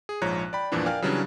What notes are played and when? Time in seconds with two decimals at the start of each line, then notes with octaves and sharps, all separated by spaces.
0.09 G#4
0.22 A#1 G#2 F3 C#5 A#5 F#6
0.53 D5 G5 B5
0.72 E2 G2 A#2 E3 F3 D4
0.86 A#4 D5 F5 G5 G#5 F6
1.02 C#3 E3 F#3 G3 C#4 D4